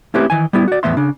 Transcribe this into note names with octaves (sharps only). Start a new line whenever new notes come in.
A3 C4 C#4 E4 G4 B4
D#3 E3 G#5
G3 B3 E4
F#4 D5
E2 A2 E3 B3 E5 C6
C#3 D4